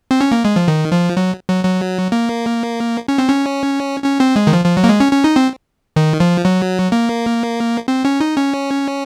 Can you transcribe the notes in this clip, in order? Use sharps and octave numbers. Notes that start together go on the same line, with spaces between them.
C4
C#4
A#3
G#3
F3
D#3
F3
F#3
F#3
F#3
A#3
C#4
C4
C#4
C#4
C4
G#3
D#3
F3
F3
F#3
A#3
G#3
C#4
C#4
D#4
C4
D#3
F3
F#3
A#3
C4
C#4
D#4
C#4